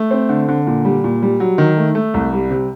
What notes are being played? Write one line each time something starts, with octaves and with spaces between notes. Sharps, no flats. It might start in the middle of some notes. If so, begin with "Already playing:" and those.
Already playing: A3
C4
D3
D3
A#2
G3
A#2
G3
F#3
D#3
A3
A3
C2
G3
C3